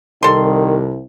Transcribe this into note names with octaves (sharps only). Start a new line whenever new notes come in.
C2 D#3 A4 C6